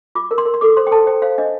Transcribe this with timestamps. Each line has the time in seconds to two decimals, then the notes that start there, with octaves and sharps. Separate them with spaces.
0.15 F4 D6
0.31 A#4
0.38 C6
0.45 A#4
0.54 C6
0.61 A4 D6
0.77 C5 C6
0.87 G5
0.91 A4 A5
1.07 C5 G5
1.22 C5 F5
1.38 D4 D#5